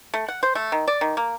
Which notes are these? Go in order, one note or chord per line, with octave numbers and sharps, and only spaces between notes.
A3
F#5
C5
A3
D#3
D5
D#3
A#3